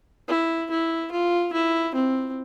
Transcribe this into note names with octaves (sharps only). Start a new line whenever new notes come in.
E4
E4
F4
E4
C4